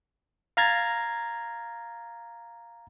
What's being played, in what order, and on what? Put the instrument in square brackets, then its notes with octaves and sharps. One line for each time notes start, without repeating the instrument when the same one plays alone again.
[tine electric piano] F5 A#5 G#6 A6